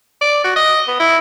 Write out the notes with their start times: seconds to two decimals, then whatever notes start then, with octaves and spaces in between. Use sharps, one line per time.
0.21 D5
0.44 F#4
0.56 D#5
0.88 B3
1.00 E4